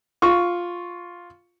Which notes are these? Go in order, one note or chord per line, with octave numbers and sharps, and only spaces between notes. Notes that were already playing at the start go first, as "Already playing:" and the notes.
F4 C#6